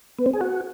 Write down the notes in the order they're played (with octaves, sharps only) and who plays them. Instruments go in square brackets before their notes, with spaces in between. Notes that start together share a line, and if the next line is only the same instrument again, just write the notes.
[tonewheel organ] B3
C4
G#4
F#4